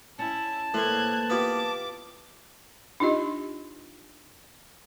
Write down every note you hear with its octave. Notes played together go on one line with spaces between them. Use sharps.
C#4 E4 A5
A2 E3 A#3 C5 F#6 G#6
B3 F4 G4 D6
D4 D#4 F4 G4 D#5